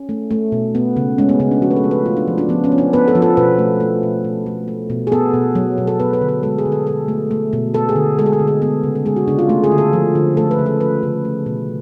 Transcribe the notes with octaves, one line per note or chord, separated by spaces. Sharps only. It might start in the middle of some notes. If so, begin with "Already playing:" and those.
Already playing: C#4
A3
A3
B2
B3
C#3
G#3 C#4
B3
C#3 B3
D4
F3 F#4
B4
A4
A3
B4
A3 F4
D4
F3
D4
F3 B3
C#4
B3
D4
B3 B4
A4
F3
A4
B2 B4
A3
A3
B2
B2
A3
A3
B2
G#4
B3 A4
B2
F#3
B2
A4
B3 B4
B4
D3
B4
G#3 A4
G#4
D3
A4
B2 A4
A3
A3
B2
B3 A4
G#4
D3
G#3 A4
G#4
A4
D3
G#4
B3 A4
C#3
A4
G#3 G#4
F#4
C#3 D4
F4
A3
G#4
D3
A4
F3
D3
A3 A4
B4
C#3
A4
F3 B4
C#3
A3
B2